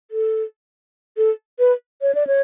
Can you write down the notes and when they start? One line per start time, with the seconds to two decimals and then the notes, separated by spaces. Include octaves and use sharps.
0.11 A4
1.17 A4
1.59 B4
2.02 C#5
2.15 D5
2.27 C#5